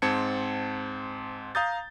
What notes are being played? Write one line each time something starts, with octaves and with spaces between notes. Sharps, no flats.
G#2 C4 A5 G#6 C#7
F5 A#5 D#6 G6 A6